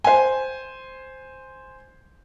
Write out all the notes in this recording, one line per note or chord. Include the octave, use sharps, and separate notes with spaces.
C5 G#5